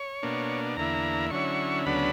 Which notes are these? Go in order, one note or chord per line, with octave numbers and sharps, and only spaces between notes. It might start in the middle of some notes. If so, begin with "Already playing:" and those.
Already playing: C#5
B2 A#3 D4
E2 D3 A#3 E4 A#5
D3 F#3 C#4 E4 C#6
D2 C#3 F#3 B3 D4 B5